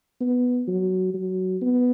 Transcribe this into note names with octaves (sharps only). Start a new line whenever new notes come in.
B3
F#3
F#3
B3